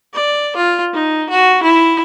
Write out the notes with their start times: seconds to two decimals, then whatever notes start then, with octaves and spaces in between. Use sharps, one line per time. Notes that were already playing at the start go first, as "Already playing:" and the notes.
0.13 D5
0.56 F4
0.93 D#4
1.30 F#4
1.63 E4